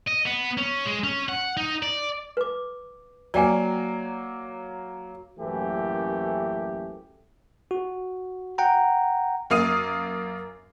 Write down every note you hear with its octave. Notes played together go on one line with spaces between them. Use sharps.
D#5
B3
C#4
G#3
C#4
F#5
D#4
D5
B4 D6
F#3 A#3 D5 G5 G#5
A1 F#2 E3 A3 A#3 G4
F#4
F#5 G5 A#5
F#2 A#3 F5 D#6 D#7